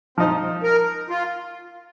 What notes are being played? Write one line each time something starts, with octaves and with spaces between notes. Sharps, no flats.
F3 C4 D#4
A#4
F4